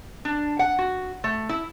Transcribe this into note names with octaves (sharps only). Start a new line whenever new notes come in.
D4
F#5
F#4
A3
E4